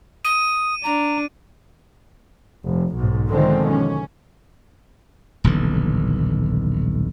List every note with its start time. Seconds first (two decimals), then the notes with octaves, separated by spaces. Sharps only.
0.25 D#6 D#7
0.84 D4 A#5
2.65 F1
2.95 B1 G#2
3.28 B2 D3 D#3 F3 G#3 C4
3.70 C#4
5.44 D#1 B1 D3 E3